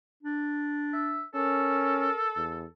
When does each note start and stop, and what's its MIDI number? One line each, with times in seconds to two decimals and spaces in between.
0.23 1.23 62
0.93 1.23 76
1.35 2.09 61
1.35 2.69 69
1.35 2.36 70
2.37 2.65 40